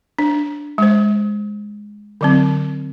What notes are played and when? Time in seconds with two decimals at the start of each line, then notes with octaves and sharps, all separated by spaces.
0.19 D4
0.78 G#3 C5
2.21 D3 F#3 C4